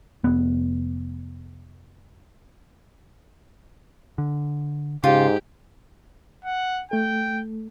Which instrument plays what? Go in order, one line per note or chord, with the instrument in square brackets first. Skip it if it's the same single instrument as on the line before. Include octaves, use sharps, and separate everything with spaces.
[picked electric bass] F1 B3
D3
[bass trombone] G#2 [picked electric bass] C#3 [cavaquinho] F4 [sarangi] G4
[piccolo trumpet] F#5
[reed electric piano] A3 A4 [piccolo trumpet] G5